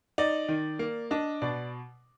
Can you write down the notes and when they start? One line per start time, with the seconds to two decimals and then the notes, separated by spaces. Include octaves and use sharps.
0.18 D#4 D5
0.48 D#3
0.79 A#3
1.11 D4 D#5
1.42 B2 D5